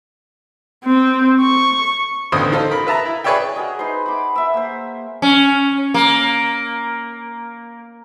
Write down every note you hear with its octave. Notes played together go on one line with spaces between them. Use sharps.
C4
C#6
A1 D2 B3 C5 D#6
D#4 F4 A4 C5
A#4 B5
B4 E5 A5 A#5
E4
G#4 B4 C#5 D5 E5 G5
F#4 G#4 A#4 D#5
D#4 B4 C5 C6
B5 D6
E5 E6
A#3 C5
C#4
A#3